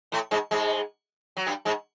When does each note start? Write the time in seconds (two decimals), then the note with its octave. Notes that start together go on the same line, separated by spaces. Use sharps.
0.12 A2 A3
0.31 G#2 G#3
0.51 G#2 G#3
1.37 F#3
1.46 G2 G3
1.65 G#2 G#3